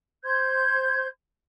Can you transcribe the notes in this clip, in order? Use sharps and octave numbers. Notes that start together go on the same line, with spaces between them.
C5 C6 G6 G#6